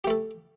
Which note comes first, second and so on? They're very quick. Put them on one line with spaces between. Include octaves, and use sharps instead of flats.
G4 A3 A4